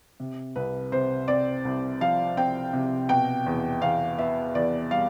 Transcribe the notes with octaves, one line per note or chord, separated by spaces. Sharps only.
C3
C2 B4
C3 C5
C4 D5
C2
F3 F5
C4 G5
C3
B2 G5
E2
E2 F5
B3 E5
E2 D5
G3 F5